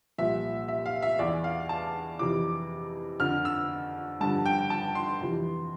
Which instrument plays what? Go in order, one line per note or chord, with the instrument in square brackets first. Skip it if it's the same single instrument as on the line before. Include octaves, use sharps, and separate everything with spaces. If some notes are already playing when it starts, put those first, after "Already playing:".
[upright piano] C2 A#2 F3 E5
E5
F5
E5
E2 E3 D5
F5
A5
F2 C3 E3 D6
F2 D3 F3 F6
E6
G2 D3 F3 A5
G5
A5
C6
F2 C3 E3